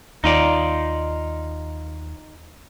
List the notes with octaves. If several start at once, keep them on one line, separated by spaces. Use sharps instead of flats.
D#2 D#4 F4 D5